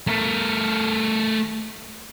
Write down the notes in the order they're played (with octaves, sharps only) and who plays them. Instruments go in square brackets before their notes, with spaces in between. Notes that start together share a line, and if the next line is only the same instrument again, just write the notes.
[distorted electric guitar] A3 A#4